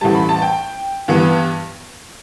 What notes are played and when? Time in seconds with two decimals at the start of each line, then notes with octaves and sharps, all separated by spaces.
0.01 A1 A2 G3 A5
0.15 B5
0.29 A5
0.42 G5
1.08 G2 E3 B3